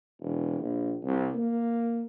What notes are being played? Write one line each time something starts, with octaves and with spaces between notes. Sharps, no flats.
E1
A#1
C2
A#3